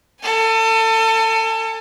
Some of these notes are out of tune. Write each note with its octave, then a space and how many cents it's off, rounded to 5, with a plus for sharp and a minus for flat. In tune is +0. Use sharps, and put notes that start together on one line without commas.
A4 +30 G#5 +0